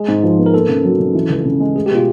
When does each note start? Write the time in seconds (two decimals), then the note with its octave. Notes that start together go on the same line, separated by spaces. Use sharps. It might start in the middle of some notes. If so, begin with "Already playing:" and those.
Already playing: G#3 G#4
0.08 G#2
0.23 F3
0.38 B3
0.46 A#4
0.53 A#3 A4
0.69 C#3
0.84 F#3
0.99 C#3
1.15 E3
1.30 C#2
1.45 C#3
1.60 G#3
1.75 A3 G#4
1.86 G4
1.91 B2 F4